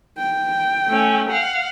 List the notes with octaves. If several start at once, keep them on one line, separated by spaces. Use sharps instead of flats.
G5
A3 C#4
F5 F#5